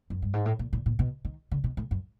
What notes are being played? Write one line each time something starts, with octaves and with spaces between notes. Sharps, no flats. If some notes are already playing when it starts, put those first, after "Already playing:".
F#2
G2
G#2
A2
A#2
A#2
A#2
B2
D#3
D3
B2
A2
F#2